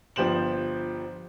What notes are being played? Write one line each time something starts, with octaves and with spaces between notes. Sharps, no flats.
G1 F3 G4 C5 E7 F#7